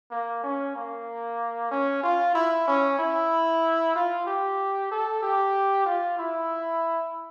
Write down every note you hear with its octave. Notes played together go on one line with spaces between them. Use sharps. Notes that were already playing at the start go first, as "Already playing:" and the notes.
A#3
C#4
A#3
C#4
F4
E4
C#4
E4
F4
G4
A4
G4
F4
E4